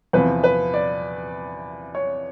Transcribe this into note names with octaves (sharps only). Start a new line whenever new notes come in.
E2 C3 F3 B4
B4
D5
C#5